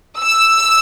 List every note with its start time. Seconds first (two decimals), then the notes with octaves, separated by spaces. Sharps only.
0.21 E6